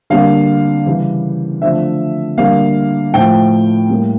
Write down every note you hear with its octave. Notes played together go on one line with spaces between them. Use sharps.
D3 G3 A#3 F5
C#3 E3 G3
D3 F3 A3 E5
D3 G3 A#3 F5
A2 F3 A3 G5
A2 G3 A#3